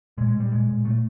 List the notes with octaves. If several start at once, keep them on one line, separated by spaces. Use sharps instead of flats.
A#2 G#3
G#3
A#2
G3
A#2 G#3
A#2
A#2 A3